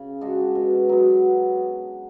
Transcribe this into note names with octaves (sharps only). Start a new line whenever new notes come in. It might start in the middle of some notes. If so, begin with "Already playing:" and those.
Already playing: C#3
G#3 D4 F#4
B2
F#3 B3